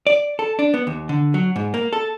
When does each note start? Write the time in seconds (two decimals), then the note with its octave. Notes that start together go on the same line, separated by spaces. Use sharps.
0.07 D5
0.39 A4
0.59 D4
0.74 B3
0.87 D#2
1.09 D3
1.34 F#3
1.56 G#2
1.74 A#3
1.93 A4